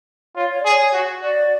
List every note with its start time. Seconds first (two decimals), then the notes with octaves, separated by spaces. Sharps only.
0.36 F4 C#5
0.50 C#5
0.59 D5
0.65 G#4 C#5
0.93 F#4
1.21 F#4 D5